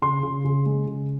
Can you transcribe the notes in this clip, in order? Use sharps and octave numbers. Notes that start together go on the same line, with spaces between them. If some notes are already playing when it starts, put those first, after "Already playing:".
C#3 C6
C#3
C#3
G#3
C#3